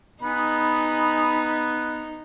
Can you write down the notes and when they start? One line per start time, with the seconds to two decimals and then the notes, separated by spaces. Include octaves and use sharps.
0.22 B3 D#4 G#4 B5